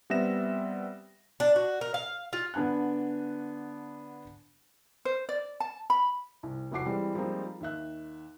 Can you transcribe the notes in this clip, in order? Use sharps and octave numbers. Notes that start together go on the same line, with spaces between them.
G3 B3 C4 E5 A#6 E7
D4
F#4
A#4
F5
F4
D3 B3 D4 G#5 F#6
C5
D5
A5
B5
C2
F1 C2 F#4 D6 C7
E3 G3 G#3 C4
F3 G3 G#3 A#3 C4 D#4
D#2 D#3 E5 F#6